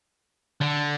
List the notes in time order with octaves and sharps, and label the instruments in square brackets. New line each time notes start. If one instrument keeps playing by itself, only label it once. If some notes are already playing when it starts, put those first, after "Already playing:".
[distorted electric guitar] D3